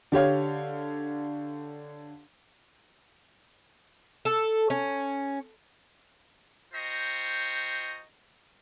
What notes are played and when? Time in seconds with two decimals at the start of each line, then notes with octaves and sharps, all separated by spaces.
0.12 D3 G4 C#5 F5
4.25 A4
4.70 C#4
6.74 F4 C5 D#5 G5 A#5 C#6